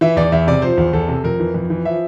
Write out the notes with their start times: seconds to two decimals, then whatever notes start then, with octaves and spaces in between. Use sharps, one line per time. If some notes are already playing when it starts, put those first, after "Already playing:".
0.01 E3 E5
0.16 E2 D5
0.32 E2 E5
0.47 C3 D5
0.62 F3 C5
0.77 E2
0.93 E2 A4
1.08 C3
1.24 F2 A#4
1.40 E3
1.54 F2
1.70 E3
1.85 F3 E5